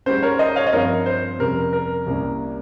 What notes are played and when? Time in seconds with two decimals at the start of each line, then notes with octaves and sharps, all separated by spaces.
0.06 G#2 G3 C#4 C5
0.23 A#4 C#5
0.39 C5 D#5
0.56 C#5 F5
0.67 D#5
0.72 G2 F3 C4 A#4 C#5
1.06 C5
1.39 F2 C3 G3 C#4 A#4
1.73 A#4
2.06 C2 C3 G3 A#3 C#4